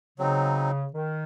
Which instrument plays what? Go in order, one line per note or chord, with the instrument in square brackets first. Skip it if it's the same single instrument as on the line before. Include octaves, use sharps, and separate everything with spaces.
[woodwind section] C#3 [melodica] F#3 C4 D#4
[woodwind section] D#3